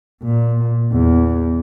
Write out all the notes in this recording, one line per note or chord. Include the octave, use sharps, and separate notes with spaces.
A#2
E2